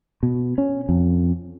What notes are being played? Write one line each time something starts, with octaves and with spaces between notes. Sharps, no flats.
B2
C#4
F2